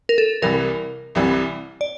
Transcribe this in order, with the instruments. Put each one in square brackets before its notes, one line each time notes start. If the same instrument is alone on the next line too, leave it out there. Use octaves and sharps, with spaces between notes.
[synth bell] A#4
A4
[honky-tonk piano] C2 C3 E3 G3 [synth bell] A#4
[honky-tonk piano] C2 C3 E3 G3
[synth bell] D5